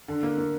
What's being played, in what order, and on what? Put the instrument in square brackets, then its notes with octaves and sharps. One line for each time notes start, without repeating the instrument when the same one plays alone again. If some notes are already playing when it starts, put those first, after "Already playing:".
[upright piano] D3
A#3
A#3